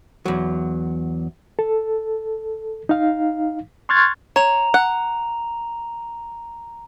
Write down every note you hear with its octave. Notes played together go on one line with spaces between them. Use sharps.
E2 F#3
A4
D#4 F5
C6 C#6 F6 F#6 G#6 A6
C#5 A#5 F7
F#5